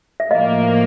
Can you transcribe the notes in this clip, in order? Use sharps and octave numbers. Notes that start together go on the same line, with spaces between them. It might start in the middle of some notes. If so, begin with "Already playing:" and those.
E5
A2 F3 A#3 D#5 F5